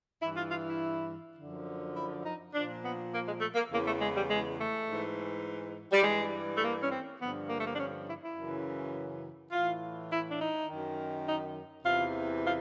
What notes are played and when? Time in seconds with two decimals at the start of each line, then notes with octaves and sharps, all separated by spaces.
0.21 G2 E3 E4
0.36 F4
0.51 F4
0.65 E4
1.38 F#2 D3 F3
1.96 E4
2.25 D#4
2.54 A#2 F3 D4
2.82 B3
3.13 A#3
3.26 G#3
3.41 A3
3.55 A#3
3.70 E2 C#3 E3 A#3
3.84 A3
3.99 G#3
4.13 G3
4.29 G#3
4.57 A3
4.86 G#2 E3
5.92 G3
6.02 G2 E3 G#3
6.57 A3
6.61 A#3
6.81 C#4
6.90 C4
7.19 G2 D3 F3 B3
7.48 A#3
7.56 A3
7.63 A#3
7.71 D4
7.77 C#4
8.06 E4
8.21 E4
8.34 F#2 C#3 E3
9.51 A2 E3 F4
10.09 E4
10.28 D4
10.38 D#4
10.67 F#2 D#3
11.25 D#4
11.84 E2 C3 E3 F4
12.42 F4